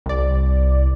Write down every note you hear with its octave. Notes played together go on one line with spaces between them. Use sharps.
C2 D5